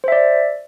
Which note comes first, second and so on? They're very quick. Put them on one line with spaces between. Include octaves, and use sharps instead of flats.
C5 E5 D5